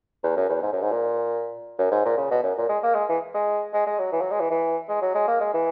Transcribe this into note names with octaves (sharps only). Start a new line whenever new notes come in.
E2
F#2
E2
G#2
F#2
G#2
A#2
F#2
G#2
A#2
C#3
B2
F#2
A#2
G#3
A#3
G#3
E3
G#3
G#3
G#3
F#3
E3
F#3
G#3
E3
E3
G#3
F#3
G#3
A#3
G#3
E3